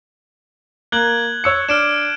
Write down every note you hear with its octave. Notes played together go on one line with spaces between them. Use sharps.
A#3 F#6 G#6 F#7
C#5 E6 C#7
D4 F6 D7 E7